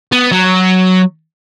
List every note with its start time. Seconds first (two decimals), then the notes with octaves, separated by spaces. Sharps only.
0.12 B3
0.32 F#3